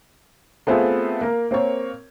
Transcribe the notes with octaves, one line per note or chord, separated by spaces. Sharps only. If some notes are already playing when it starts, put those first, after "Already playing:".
A3 B3 C4 F4 G#4
A#3 A#4
A#3 C4 A#4 C#5